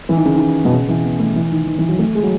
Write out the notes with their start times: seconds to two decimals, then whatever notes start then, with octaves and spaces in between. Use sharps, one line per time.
0.09 E3
0.17 D#3
0.25 C#3
0.35 D#3
0.65 B2
0.73 C#3
0.88 E3
1.04 B3
1.19 A3
1.36 E3
1.51 D#3
1.67 D#3
1.78 E3
1.89 F#3
1.99 A3
2.15 G#3
2.23 F#3